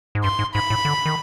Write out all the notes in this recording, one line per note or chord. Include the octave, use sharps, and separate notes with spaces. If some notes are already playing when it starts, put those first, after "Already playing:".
G#2
G2 C6
G#2
G#2 B5
A2
D3
D#3